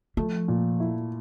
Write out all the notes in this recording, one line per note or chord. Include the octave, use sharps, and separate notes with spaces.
F3 A3
A#2
E4